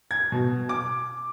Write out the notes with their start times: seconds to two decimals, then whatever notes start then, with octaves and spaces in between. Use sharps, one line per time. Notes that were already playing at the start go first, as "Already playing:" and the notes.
0.11 G#6
0.32 B2
0.69 D6